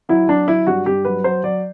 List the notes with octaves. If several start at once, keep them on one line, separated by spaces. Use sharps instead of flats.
F#3 E4
F#3 D4
F#3 E4
G2 F#4
G2 G4
F#3 B4
F#3 C5
F#3 D5